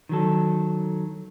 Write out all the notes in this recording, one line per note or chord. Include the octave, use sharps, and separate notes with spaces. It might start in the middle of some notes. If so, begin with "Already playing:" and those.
D#3 F#3 A4